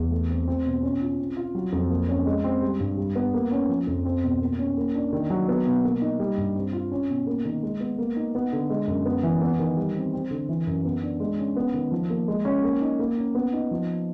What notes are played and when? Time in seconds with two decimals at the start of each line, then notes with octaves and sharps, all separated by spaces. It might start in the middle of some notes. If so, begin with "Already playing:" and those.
Already playing: E2
0.11 A3
0.30 C4
0.48 C4
0.66 B2
0.83 C#4
1.01 F4
1.18 C4
1.37 F4
1.55 F#3
1.73 F2
1.90 A#3
2.09 C#4
2.26 G#3
2.44 C4
2.62 G3
2.80 G2
2.97 G3
3.16 B3
3.34 A#3
3.51 C#4
3.69 F3
3.87 F2
4.05 C4
4.23 B2
4.41 A#3
4.59 C#4
4.77 A#3
4.95 D4
5.13 D#3
5.30 F#3
5.48 B3
5.66 B2
5.84 A#3
6.01 D#4
6.19 G3
6.37 G2
6.55 C4
6.73 F4
6.92 C#4
7.09 B2
7.27 A#3
7.45 D#3
7.63 G#3
7.80 B3
7.98 A#3
8.16 D#4
8.35 B3
8.53 D3
8.70 G#3
8.87 F#2
9.06 B3
9.23 E3
9.41 B3
9.59 D#3
9.77 G3
9.95 C4
10.14 C4
10.31 D3
10.49 E3
10.67 F#2
10.85 B3
11.03 D4
11.20 G#3
11.38 C#4
11.56 B3
11.74 D#3
11.92 F3
12.10 A#3
12.28 G#3
12.45 C#4
12.64 A#3
12.81 D#4
12.99 A#3
13.17 C#4
13.35 B3
13.53 D#4
13.71 F3